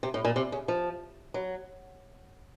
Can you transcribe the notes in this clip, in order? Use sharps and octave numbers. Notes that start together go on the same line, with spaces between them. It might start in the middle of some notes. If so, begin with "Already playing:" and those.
C3
A2
A#2
C3
C#3
F3
F#3